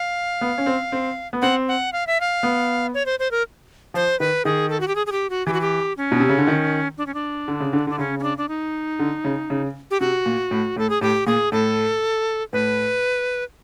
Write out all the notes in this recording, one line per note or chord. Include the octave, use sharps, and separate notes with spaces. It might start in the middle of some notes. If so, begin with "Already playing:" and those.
Already playing: F5
B3
C#4
C4
C4
B3
C4 F#5
F#5
F5
E5
F5
B3
C#5
C5
C5
A#4
F3 C5
D#3 B4
D#3 G#4
A4
F#4
G4
G#4
G#4
G4
F#4
E3 G4
F#4
G4
C#4
B2
C3
C#3
D3
D#3
D4
C#4
D4
D3
C#3
D3
D3 D4
C#3 C#4
C#4
D4
D4
D#4
D3
C#3
C#3
G4
C3 F#4
A#2
A2
A2 A4
G#4
A2 G4
A#2 G#4
A2 A4
A2 B4